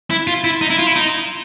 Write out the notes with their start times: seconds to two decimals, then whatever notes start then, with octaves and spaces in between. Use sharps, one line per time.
0.10 E4
0.27 F4
0.44 E4
0.61 D#4
0.70 E4
0.79 F4
0.86 E4
0.96 D#4